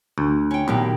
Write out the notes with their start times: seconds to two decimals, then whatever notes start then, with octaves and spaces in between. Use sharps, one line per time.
0.18 D2
0.51 C#4 G5
0.68 B1 A#2 D#3 G4